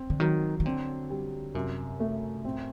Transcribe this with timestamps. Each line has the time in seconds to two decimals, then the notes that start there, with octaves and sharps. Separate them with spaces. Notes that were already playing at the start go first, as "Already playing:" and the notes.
Already playing: C4
0.10 D3
0.20 D#3 F#3
0.60 D#3
0.66 D3 C4
1.10 G3
1.54 F#2 C3
2.00 A3
2.44 A2 C4